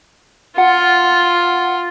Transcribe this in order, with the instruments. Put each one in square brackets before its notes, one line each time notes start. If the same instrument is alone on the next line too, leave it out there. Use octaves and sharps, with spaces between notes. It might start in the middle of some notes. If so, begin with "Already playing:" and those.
[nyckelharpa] F4 [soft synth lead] F#5